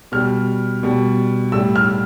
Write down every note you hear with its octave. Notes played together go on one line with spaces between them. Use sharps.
B2 G3 F6
B2 G3
A2 G3 E6
F6